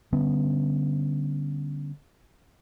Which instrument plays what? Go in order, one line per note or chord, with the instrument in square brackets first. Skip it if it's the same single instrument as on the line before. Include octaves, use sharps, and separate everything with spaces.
[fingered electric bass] D3 G3 B3 C#4